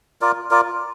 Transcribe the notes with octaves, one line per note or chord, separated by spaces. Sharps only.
F4 A#4 D5
F4 A#4 D5